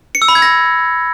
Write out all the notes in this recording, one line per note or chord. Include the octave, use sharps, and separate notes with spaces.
C#7
E6
B5
G#6
A#6